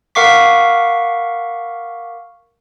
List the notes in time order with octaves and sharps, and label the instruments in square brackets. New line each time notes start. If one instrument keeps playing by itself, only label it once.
[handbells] A#4 F5 F#5 C#6 D6 B6